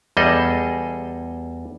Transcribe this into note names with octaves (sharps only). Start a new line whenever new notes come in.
E2 G3 G#4 A4 D#5